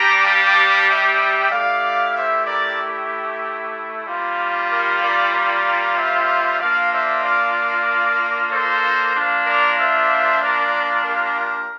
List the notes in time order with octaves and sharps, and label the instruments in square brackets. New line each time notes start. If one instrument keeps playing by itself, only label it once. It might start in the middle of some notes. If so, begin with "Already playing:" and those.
Already playing: [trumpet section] G3 D4 G4 G5 A#5
F5 A5
E5 G5
A3 E4 G4 D5 F5
C5 E5
A#4 D5
G3 A#3 F4
G4 A#4
A#4 D5
A#4 D5
C5 E5
A#3 D4 F4 D5 F5
C5 E5
D5 F5
A4 C5
A#3 D4 F4
A#4 D5
C5 E5
A#4 D5
G4 A#4